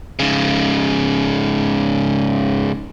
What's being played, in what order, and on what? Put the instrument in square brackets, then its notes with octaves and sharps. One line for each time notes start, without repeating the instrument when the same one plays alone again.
[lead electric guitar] G#2 C#3